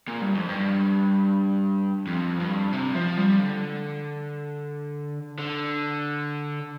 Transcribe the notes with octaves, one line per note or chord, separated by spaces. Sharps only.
A#2
G2
F2
G2
F2
G2
C3
F3
G3
D3
D3